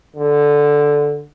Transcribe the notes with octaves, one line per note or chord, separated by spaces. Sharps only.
D3